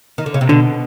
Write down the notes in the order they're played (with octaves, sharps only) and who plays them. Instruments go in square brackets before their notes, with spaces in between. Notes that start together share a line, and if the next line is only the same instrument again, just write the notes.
[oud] D#3
D3
C#3
C3
[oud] B2 [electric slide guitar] D3